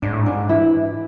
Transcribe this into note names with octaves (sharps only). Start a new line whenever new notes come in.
G#2 D4
A2
G#2
D4
E3 E4